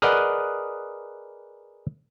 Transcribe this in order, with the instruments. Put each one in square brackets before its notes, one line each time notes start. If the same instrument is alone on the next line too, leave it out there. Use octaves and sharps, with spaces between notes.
[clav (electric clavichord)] G#4 A#4 B4 D5 D#5 F#5